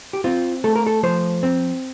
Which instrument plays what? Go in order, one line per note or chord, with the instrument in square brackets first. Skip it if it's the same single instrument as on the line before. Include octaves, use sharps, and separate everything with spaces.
[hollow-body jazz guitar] G4
C4 F4
A3 A4
A#4
A4
F3 C5
C4